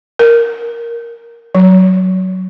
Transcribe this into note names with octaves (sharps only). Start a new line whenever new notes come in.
A#4
F#3